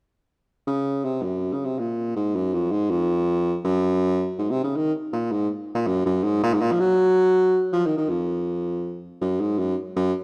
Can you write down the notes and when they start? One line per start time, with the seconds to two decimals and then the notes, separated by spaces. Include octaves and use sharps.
0.67 C#3
1.04 C3
1.23 F#2
1.53 C#3
1.65 C3
1.79 A#2
2.16 G#2
2.35 F#2
2.53 F2
2.72 G#2
2.90 F2
3.64 F#2
4.38 G#2
4.51 C3
4.63 C#3
4.76 D#3
5.13 A#2
5.32 G#2
5.75 A#2
5.87 F#2
6.06 F#2
6.24 G#2
6.44 A#2
6.54 G#2
6.61 A#2
6.72 F3
6.80 F#3
7.73 F3
7.86 D#3
7.98 D#3
8.09 F2
9.21 F#2
9.41 G#2
9.59 F#2
9.96 F#2